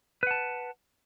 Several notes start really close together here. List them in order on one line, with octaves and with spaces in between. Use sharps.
B4 F#5 A5